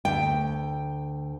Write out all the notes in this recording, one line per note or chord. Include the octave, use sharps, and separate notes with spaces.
D2 G5